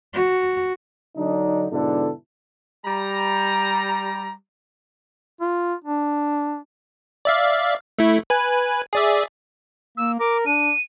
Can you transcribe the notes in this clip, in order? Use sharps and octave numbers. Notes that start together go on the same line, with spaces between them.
F#4
D3 F#3 D4 D#4
G#2 B2 D3 D4 E4 A4
G3 A#5
F4
D4
D5 E5 F5
A3 E4
B4 G#5
G#4 D5 E5
A#3 E6
A#4 D6
D4 D#7